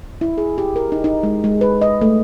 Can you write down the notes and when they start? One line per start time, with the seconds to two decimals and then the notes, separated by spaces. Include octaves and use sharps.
0.21 E4
0.38 G#4
0.58 G4
0.76 A#4
0.92 D#4
1.04 D#4
1.23 G#3
1.44 G#3
1.61 B4
1.82 D#5
2.01 A3